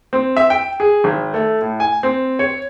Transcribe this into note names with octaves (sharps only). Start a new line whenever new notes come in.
C4
E5
G5
G#4
G#1
A3
A2
G#5
C4
C#5